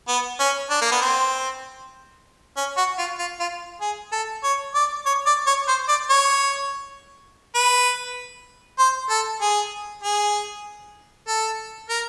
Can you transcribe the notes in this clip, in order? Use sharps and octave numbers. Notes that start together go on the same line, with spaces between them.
B3
C#4
D4
A#3
B3
C4
C#4
F#4
F4
F4
F4
G#4
A4
C#5
D5
C#5
D5
C#5
C5
D5
C#5
B4
C5
A4
G#4
G#4
A4
A#4